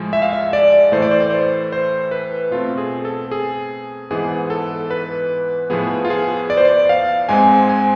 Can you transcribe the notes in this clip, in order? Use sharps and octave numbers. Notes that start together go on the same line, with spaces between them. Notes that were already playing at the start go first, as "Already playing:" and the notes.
Already playing: A2 F3 G#3
E5
F5
E5
D5
A2 E3 A3 C5
D5
C5
D5
C5
C5
B4
B2 A3 C4 F4
G#4
A4
G#4
G#2 E3 B3 G#4
A4
B4
A2 F3 B3 G#4
F4
G#4
D5
C5
D5
F5
G#2 G#3 C4 G#5
G#5